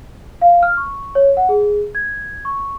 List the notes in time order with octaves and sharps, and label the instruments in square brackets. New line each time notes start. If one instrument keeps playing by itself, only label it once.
[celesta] F5
F6
C#6
C#5
F#5
G#4
G#6
C#6